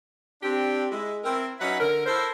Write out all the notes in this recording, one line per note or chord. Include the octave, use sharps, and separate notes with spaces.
C4 D4 G4
G#3 E4
C4 E4 A#4
F#3 C#4 D#4 B4 E5 F#5
D3 A#4
E4 A4 A#4 C5